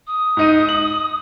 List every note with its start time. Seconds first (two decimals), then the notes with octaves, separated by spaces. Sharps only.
0.07 D#6
0.37 G#2 D#4 D#7
0.69 F#7